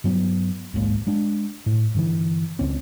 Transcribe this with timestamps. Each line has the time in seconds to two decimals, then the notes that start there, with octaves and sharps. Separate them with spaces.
0.04 G2 F#3 B3
0.74 D1 A#1 G#2 A#3
1.07 G#3 D4
1.66 A2
1.94 G2 D3 E3
2.59 C#2 C4 C#4